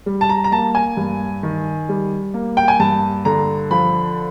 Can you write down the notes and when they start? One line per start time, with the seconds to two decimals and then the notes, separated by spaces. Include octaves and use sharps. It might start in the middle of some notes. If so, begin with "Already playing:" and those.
0.06 G3
0.21 A5
0.29 A#5
0.44 A#5
0.52 A#3 A5
0.75 G#5
0.97 G2
1.43 D#3
1.89 G3
2.34 A#3
2.57 G5
2.68 G#5
2.80 G2 A5
3.25 D3 A#5
3.71 F3 B5